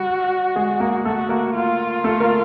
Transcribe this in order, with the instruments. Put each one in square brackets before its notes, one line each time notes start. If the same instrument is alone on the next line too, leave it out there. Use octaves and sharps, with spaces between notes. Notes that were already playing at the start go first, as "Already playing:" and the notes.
Already playing: [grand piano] G3 [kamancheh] F#4
[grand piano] G#3 G#4
A#3 A#4
[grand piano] A3 A4 [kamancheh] F#4
[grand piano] A#3 A#4
[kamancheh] F4
[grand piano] A3 A4
A#3 A#4